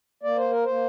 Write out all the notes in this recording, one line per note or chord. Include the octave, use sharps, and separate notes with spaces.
A#3 D5
C5
A#4
A#3 C5